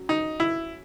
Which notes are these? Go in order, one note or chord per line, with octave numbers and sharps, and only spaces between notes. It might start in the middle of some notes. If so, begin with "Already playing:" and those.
Already playing: F#3 C#4
D#4
E4